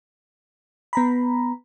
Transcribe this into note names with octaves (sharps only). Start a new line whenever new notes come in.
B3 A#5 B5